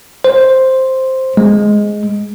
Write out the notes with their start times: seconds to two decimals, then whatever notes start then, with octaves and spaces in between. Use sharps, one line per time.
0.24 C5
1.37 G#3